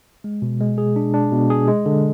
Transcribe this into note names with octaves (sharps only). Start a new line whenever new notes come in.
G#3
B2
G#3
G#4
D4
D4
B2
G#4
G#3
D3